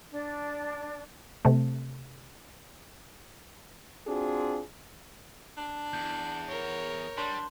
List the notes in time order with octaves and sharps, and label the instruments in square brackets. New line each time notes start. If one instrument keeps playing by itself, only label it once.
[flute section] D4
[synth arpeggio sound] C3 A3
[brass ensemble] C4 D4 F4 F#4 G#4
[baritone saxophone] D4
[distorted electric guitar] E2 [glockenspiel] G6
[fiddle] A#4 C#5
[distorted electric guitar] G3 [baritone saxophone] D4 [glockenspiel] C6